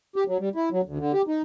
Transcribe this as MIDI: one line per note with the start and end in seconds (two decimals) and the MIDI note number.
0.16 0.24 67
0.28 0.37 54
0.39 0.49 55
0.55 0.69 64
0.72 0.81 54
0.85 0.98 38
0.98 1.12 50
1.13 1.22 67
1.27 1.42 63